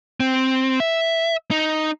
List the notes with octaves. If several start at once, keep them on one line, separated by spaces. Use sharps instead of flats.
C4
E5
D#4